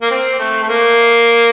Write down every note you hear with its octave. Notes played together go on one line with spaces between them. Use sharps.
A#3
C4
A3
A3
A#3